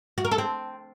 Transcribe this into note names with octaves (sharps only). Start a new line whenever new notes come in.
F#4
A#4
A4
C4